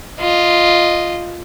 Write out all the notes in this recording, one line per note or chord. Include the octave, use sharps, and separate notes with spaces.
F4 D#5